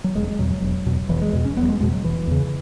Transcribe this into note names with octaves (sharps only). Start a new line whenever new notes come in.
F#3
E1 G#3
G#3
E2 B2 F#3
F#3
E1
E2 B2
E1 E3
G#3
E2 B2
C#4
E1 B3
F#3
G#3
E2 B2 G#3
F#3
E1 E3
E2 C#3